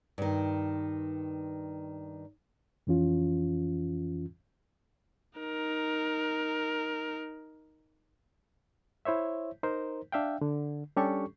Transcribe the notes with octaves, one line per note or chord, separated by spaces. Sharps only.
G2 D#3
F2 E3 C#4 F4
D#4 A#4
E4 C5 C#5 E5
D#4 A#4 C5
D4 E5 F5 G5
D3
G3 C#4 D4 G4 A4 C#6